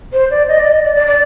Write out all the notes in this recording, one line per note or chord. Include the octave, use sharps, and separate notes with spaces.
C5
D5
D#5
D5
D#5
D5
D5
D5